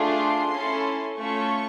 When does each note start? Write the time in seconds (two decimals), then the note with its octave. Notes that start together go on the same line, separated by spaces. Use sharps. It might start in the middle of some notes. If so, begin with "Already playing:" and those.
Already playing: A3 D4 F4 G#4 C6
0.52 C#4 E4 A4
1.17 A3 C#4 F4 A4 C#6